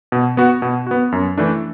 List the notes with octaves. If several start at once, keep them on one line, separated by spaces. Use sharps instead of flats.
B2
B3 F#4
B2
B3 F#4
F#2
E3 A3 D4